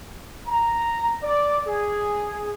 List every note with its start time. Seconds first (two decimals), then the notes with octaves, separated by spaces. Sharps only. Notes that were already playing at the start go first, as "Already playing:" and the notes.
0.48 A#5
1.23 D5
1.67 G#4